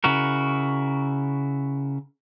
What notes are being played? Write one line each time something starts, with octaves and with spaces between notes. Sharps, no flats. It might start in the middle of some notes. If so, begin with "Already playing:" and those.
C#3 E4 F#4 A#4